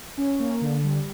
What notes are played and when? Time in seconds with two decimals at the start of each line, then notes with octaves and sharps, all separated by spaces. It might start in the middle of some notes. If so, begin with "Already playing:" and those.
0.18 C#4
0.40 A#3
0.61 D3
0.84 G3